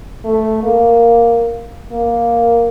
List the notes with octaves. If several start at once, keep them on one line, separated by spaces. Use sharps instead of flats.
A3
A#3
A#3